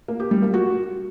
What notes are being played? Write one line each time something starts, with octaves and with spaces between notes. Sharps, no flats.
A#3
G4
G3
A#3
F#4